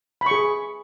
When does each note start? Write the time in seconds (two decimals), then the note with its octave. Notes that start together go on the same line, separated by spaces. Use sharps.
0.21 B5
0.26 C#6
0.31 G#4